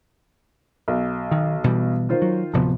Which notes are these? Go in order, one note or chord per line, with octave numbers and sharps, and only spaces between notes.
B1
D#3
B2 E3 G3
D#3 F4 C5
F#3
D1 C3 F3 B3